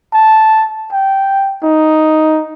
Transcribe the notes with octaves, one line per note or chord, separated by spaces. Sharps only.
A5
G5
D#4